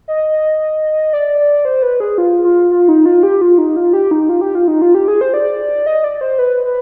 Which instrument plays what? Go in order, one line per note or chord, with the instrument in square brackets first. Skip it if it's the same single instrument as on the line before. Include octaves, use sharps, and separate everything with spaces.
[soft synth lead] D#5
D5
D5
C5
B4
G#4
F4
F4
F4
D#4
F4
G4
F4
D#4
F4
G4
D#4
F4
G4
F4
D#4
F4
G4
G#4
C5
D5
D#5
D5
C5
B4
B4